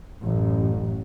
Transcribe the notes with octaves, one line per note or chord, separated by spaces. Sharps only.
A1 F#2